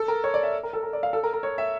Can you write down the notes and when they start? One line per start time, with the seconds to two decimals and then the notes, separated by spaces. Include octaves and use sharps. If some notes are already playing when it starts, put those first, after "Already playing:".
Already playing: A4
0.08 A#4
0.24 C#5
0.34 D5
0.43 E5
0.63 A#4
0.73 A4
0.83 A#4
0.93 D5
1.03 F5
1.13 A4
1.23 A#4
1.33 A#4
1.43 C#5
1.58 E5